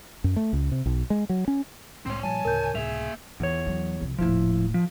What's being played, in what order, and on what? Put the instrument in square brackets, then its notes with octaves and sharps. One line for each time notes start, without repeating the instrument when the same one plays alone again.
[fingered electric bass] F#2
A3
C#2
C3
B1
G#3
F#3
C#4
[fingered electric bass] C2 A2 G#3 [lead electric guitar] C4 C#5 [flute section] C6
[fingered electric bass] A#2 F3 G3 [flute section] C#5 A5 [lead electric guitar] G#5
[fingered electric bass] D2 A2 C#3 [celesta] A#4 G6
[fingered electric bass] C#2 A2 C3 [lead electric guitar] A#3 E5 [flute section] G#4 [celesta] F7
[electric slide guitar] E2 C#5 [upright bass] E3 F4
[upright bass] F#3
C2 F3
[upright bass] D#1 A2 [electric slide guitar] F3 E4
[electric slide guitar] F3